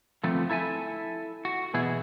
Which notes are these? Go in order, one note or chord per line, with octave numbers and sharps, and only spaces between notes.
D3 F3 A3 B3 C4
E4 A4 E5 G#5
F#4
B2 E3 B3 E4 G#4